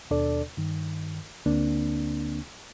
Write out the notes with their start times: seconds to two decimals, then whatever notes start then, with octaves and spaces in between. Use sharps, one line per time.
0.11 D#2 B2 D4 A4 D5
0.57 G2 D#3
1.46 D2 D3 A#3 C4 D4